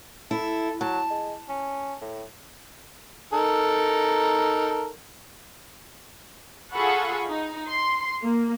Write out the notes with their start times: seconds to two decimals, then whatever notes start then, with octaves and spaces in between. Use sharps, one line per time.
0.31 E4 A4
0.81 F#3 A5
1.10 G#3
1.49 C#4
2.02 A2
3.33 D#4 A4 A#4
6.73 F4 G#4 A4 F#5 B5 C#6
7.27 D#4
7.69 C6
8.21 A#3